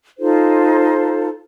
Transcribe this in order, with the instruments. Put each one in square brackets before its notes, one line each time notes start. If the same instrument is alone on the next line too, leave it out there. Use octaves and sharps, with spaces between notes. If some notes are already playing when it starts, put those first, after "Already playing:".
[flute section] D#4 F4 A4 C5